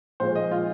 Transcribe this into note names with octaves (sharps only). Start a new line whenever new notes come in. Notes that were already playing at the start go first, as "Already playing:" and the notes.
A#2 F3 G#3 C5
D#5
F4